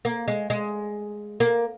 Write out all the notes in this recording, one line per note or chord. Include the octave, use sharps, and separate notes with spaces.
A#3
G#3
G#3
A#3